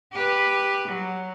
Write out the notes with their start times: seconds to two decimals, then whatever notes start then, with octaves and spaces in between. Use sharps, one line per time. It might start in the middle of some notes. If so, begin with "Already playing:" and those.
0.13 G4 B4
0.88 F#3